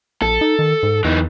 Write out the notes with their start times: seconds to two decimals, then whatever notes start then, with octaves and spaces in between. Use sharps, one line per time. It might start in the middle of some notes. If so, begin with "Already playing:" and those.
0.22 A#1 A4
0.41 D#4
0.59 D#3
0.83 G#2
1.05 E2 E3 D#4